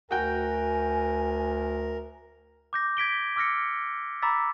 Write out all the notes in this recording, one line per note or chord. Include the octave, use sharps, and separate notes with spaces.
D2 F#4 A#4 G5 G#5
D6 G6 A#6
G#6 B6 D7 G7
D6 E6 F6 A#6 C#7
A#5 B5 D6 E6 A6 B6